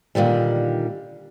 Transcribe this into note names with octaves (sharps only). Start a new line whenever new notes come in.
A#2 D3 D#3 G3